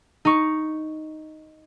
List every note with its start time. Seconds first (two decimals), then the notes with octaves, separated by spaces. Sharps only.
0.25 D#4 C#6